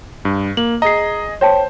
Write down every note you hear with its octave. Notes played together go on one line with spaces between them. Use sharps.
G2
A#3 F#7
G#4 D#5 A#5 C7
C5 C#5 G5 A5